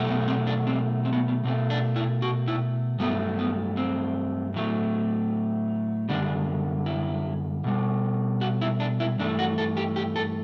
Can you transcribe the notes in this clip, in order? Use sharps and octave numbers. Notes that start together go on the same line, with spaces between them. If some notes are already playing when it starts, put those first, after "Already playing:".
Already playing: B2 F#3 A3
B3
C4
D4
C4
C4
B3
B3
B2 A3 C4
D4
E4
F#4
E4
G2 F#3 A3 B3
B3
C4
A2 F#3 A3
F#2 D3 G3 D4
E4
B2 G3
F#4
E4
D4
E4
G2 E3 A3 D4
F#4
A4
G4
G4
A4